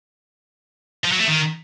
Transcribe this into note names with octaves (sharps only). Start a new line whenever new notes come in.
F3
F#3
A3
D#3